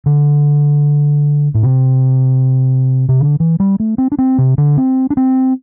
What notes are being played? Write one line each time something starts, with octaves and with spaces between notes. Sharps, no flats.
D3
A2
C3
C3
D3
E3
G3
A3
C4
D4
C4
C3
D3
C4
D4
C4